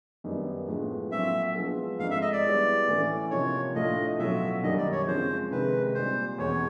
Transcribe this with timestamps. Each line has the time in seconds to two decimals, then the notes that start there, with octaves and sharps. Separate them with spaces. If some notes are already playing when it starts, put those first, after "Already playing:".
0.24 F#2 D#3 G3 B3 D#4
0.68 A2 F3 G#3 B3
1.11 A#2 F#3 A3 C4 F4 E5
1.55 F3 G#3 B3
1.99 G#2 F3 A3 C4 D#4 F5
2.11 E5
2.22 D#5
2.32 D5
2.43 G3 B3 E4 G#4 C#5
2.87 A2 E3 A3 C#4
3.31 C3 F3 A#3 D#4 C#5
3.75 A2 F3 A3 D4 F4 D#5
4.19 B2 F#3 A3 C#4 F4 E5
4.63 F#2 D#3 G3 A#3 D#5
4.78 D5
4.92 C#5
5.07 C#3 F3 G#3 C4 C5
5.51 C3 D#3 G#3 B4
5.94 A#2 G3 C4 C5
6.38 E2 B2 G#3 C4 C#5